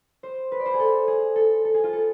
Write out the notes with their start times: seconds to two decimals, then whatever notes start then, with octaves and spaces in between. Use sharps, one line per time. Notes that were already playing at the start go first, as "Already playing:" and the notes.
0.23 C5
0.52 B4
0.60 D5
0.66 C5
0.74 G#4
0.79 A4
1.07 G#4
1.36 A4
1.65 A4
1.74 G#4
1.84 F4
1.93 A4